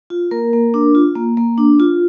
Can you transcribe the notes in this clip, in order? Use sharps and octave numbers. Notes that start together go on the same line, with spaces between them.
F4
A#3 A#4
A#3
D4
F4
A#3
A#3
D4
F4